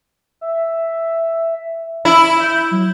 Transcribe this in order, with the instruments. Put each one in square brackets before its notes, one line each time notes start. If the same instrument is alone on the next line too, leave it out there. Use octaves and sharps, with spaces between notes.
[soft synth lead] E5
[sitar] E4 [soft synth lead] B5
[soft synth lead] G6
F#3